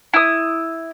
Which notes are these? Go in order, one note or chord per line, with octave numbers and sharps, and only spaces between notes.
E4 D#6